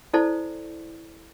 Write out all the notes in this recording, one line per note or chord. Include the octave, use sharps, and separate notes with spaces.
E4 A4 C5 D5 A5